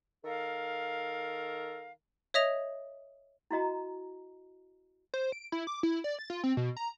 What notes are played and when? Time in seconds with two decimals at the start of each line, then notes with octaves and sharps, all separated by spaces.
0.24 D#3 A4 A#4 F5
2.34 C#5 D#5 E5 D#6 A#6 F7
3.51 E4 F#4 D#5 A#5
5.14 C5
5.32 D7
5.52 E4
5.67 D6
5.83 E4
6.04 D5
6.19 A6
6.30 F4
6.44 C4
6.57 B2
6.77 A#5